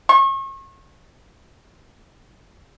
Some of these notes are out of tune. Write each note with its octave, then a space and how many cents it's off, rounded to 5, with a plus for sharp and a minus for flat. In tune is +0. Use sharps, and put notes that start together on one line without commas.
C#6 -35